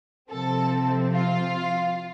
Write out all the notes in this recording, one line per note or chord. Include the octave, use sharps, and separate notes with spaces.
C3 F3 C4 A4
F4